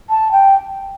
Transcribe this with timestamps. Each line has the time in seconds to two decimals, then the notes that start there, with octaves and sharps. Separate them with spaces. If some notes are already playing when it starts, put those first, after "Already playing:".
0.10 A5
0.32 G5